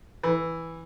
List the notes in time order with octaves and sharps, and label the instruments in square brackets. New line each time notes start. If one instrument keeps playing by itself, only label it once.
[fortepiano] E3